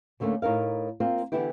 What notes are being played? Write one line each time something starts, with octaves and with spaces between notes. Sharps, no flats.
D2 D3 A3 A#3 C#4
A2 D#4 A#4 F5
A#3 C4 F4
D3 E3 F3 B3 E4 G4